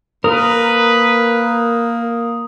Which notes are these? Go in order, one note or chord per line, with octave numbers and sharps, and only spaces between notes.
A#3 A#4 B4 D#6